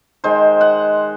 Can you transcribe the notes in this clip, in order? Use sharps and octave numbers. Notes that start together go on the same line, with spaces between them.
D#3 G#3 C5
F#5